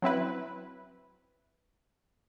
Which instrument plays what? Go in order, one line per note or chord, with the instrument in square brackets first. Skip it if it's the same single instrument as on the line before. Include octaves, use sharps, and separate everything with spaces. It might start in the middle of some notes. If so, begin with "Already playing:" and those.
[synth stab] F#3 C4 E4 B4